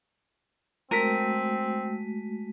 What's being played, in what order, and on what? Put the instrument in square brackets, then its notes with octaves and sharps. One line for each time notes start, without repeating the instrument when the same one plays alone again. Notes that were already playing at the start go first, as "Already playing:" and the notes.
[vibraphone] G#3 A3 F#4 [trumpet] C4 [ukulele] A#4 [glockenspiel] B6 D#7